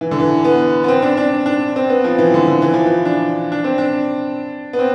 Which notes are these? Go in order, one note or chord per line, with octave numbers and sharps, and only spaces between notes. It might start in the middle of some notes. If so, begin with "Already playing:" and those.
E3
D3
E3
B3
B3
C4
D4
D4
D4
C4
B3
F3
E3
D3
D3
E3
F3
E3
D4
D4
C4
D4
B3
C4